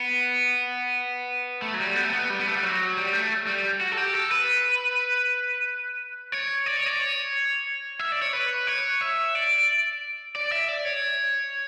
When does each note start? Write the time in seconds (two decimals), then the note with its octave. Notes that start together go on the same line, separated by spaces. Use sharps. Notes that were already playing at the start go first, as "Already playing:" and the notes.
Already playing: B3
1.62 A3
1.74 F#3
1.80 G3
1.95 B3
2.05 A3
2.13 B3
2.30 G3
2.39 B3
2.48 A3
2.55 G3
2.63 F#3
2.97 G3
3.13 A3
3.47 G3
3.81 F#4
3.92 A4
3.97 G4
4.14 A4
4.31 B4
6.32 C#5
6.66 D5
6.77 C#5
6.86 D5
7.00 C#5
7.99 E5
8.12 D5
8.22 C#5
8.33 B4
8.67 C#5
9.01 E5
9.35 D5
10.36 D5
10.52 E5
10.68 D5
10.85 C#5